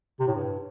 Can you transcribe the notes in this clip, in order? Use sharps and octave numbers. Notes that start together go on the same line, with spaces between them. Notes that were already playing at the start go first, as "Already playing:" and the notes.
C3
A2
G2